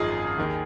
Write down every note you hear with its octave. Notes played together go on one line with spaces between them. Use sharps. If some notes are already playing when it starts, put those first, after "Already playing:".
Already playing: G#1 F#2 F3 D#4 F4 G#4
D#2 D#3